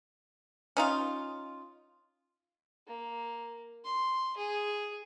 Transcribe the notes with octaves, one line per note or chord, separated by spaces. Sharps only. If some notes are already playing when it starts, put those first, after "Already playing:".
C#4 D#4 F4
A#3
C6
G#4